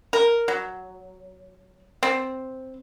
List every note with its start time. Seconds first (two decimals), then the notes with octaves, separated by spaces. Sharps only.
0.13 A#4
0.48 F#3
2.03 C4